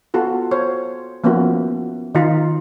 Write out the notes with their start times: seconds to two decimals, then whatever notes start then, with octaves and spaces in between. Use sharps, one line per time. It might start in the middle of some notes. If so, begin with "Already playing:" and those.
0.14 B3 F4 F#4 A4
0.51 C5 C#5
1.24 F3 A#3 B3 C#4 E4 F#4
2.15 D#3 D#4 F4